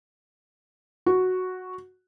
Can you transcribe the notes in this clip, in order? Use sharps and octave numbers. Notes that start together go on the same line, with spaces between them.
F#4